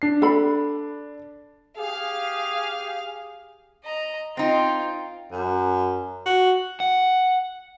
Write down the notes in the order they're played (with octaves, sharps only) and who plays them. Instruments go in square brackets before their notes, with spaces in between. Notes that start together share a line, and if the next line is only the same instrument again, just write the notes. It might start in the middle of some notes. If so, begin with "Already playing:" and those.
[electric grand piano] D4 C7
[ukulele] A4 B5
[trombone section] G4 G#4 [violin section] F5
[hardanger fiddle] D#5 A#5
[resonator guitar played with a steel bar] C4 D#4 [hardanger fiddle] F4 G5
[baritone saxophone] F#2
F#4
[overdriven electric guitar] F#5